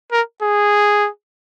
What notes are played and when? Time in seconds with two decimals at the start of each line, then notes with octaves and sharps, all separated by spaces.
0.12 A#4
0.42 G#4